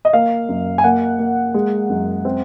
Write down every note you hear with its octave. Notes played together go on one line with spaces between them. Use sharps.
D#5
A#3 F5
F#2
G#5
A#3 F#5
A#3
G#3
F#2
C4